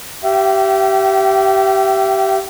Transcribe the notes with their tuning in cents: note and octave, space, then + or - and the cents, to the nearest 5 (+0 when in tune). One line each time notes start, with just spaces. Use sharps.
G4 -20 E5 +30 G5 -40